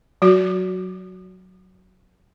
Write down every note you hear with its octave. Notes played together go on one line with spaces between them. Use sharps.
F#3 F#4